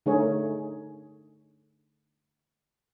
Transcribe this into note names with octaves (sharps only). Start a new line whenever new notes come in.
D3 A3 D#4 G#4 A#4 C#5